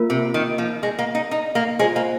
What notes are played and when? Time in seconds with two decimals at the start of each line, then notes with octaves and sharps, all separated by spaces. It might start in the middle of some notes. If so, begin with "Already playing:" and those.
Already playing: A#3 F4 A#4
0.10 C3
0.34 D#3
0.58 F3
0.83 G#3
0.99 A#3
1.15 D#4
1.31 D#4
1.55 A#3
1.79 G#3 F4 C5 G#5
1.96 A#3